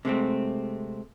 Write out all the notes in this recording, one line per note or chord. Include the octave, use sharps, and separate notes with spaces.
C3 G#3 A3 C4